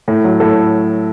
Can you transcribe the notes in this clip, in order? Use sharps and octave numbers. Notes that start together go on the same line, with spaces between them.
A2
F#3
A2 A4